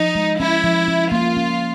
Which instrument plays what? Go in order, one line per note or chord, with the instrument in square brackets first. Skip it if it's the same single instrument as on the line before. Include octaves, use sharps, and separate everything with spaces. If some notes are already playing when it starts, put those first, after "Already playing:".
Already playing: [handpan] F3 [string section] D#4
[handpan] G#3
[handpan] C#4 [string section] E4
[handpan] F3
C#4
[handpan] A#3 [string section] F4
[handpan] C#4